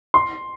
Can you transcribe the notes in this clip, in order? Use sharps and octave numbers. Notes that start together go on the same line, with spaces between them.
C6